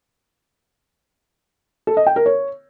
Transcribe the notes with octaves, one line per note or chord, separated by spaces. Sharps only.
A4
D#5
G5
A#4
C#5